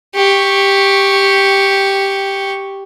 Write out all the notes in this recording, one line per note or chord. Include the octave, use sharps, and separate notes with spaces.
G4 C#6